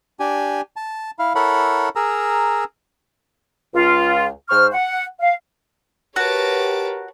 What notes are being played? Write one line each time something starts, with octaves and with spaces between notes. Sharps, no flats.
D4 G4 G#5
A5
E4 F5
E4 A4 A#4 C#5 F#5 B5
G#4 A#4 A#5 E6
C#2 F4
G#2 C5 C#6 F6
F#5
F5
F#4 G4 A#4 B4 C#5 A5 D6